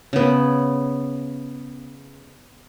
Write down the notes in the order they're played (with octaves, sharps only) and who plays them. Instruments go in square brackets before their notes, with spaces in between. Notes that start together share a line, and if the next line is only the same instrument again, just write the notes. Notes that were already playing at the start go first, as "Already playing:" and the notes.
[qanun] C#3 B3